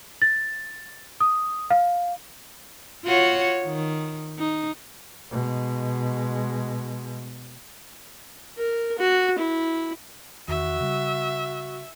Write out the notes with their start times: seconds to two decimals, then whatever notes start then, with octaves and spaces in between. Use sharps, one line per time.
0.22 A6
1.21 D#6
1.70 F5
3.05 F4 F#4 C#5
3.65 D#3
4.39 D#4
5.31 B2 G#3
8.58 A#4
8.98 F#4
9.38 E4
10.48 E2 D#3 F#4 E5
10.81 C#3 G3